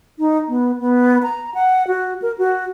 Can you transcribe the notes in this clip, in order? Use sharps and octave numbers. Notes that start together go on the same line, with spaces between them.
D#4
B3
B3
A#5
F#5
F#4
A#4
F#4